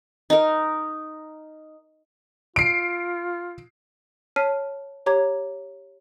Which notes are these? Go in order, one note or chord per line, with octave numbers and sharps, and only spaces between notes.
D#4 A#4
F4 C7 D7
C#5 A5 F6 B6 C7 D#7
G4 C#5 A#5 D6 G#6